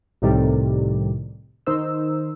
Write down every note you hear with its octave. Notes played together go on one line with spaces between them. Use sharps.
C2 A2 C3 D#3 G3
D#3 D#4 C5 E6